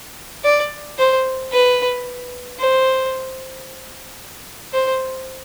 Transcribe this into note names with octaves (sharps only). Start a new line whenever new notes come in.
D5
C5
B4
C5
C5